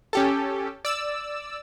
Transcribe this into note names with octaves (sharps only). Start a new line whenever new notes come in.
C#4 G4 A4
D5 E6